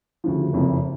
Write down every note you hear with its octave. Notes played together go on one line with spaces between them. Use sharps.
D2 C#3 F3
F#1 F2 C3 F3